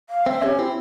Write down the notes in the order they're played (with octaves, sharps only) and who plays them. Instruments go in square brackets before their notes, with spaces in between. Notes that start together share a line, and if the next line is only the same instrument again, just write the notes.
[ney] F5
[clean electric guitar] C4 [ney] E5
[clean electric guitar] C#4 [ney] G4
[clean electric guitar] C4 [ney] E4